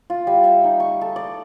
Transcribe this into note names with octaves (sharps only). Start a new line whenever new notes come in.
F4
G3
E5
D#4
C#6
A4
D5